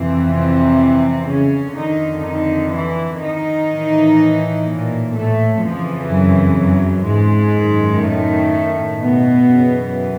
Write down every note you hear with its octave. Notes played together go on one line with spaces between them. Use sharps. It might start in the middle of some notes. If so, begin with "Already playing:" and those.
Already playing: F2 C3 E3 C4
C3 C4
C#3 C#4
F2 D3 D#3 D#4
D#3 D#4
E3 E4
D#3 D#4
A2 E3
A#2 A#3
A2 A3
F2 C#3 E3 F3
F#2 F#3
F#2 F#3
G#2 G#3
F#2 D#3
A2 A3
B2 B3
F#2 C#3 E3